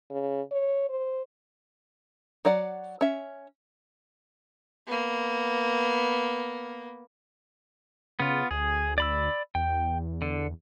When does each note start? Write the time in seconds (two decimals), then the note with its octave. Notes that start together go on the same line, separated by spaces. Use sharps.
0.10 C#3
0.52 C#5
0.89 C5
2.45 F#3 F#4 D5 F#5
3.01 C#4 E5
4.87 A#3 B3
8.20 C#3 B3 F4
8.51 D2 G#4
8.98 D5 B5 E6
9.55 E2 G5
10.22 D3